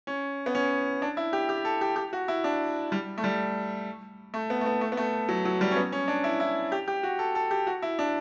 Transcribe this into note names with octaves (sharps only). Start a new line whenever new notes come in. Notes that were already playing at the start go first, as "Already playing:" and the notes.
C#4
B3
C#4
D4
E4
G4
G4
A4
G4
G4
F#4
E4
D4
G3
A3
G3
A3
B3
A3
B3
A3
B3
A3
F#3
F#3
G3
C#4
B3
C#4
D4
E4
E4
G4
G4
F#4
A4
A4
G4
F#4
E4
D4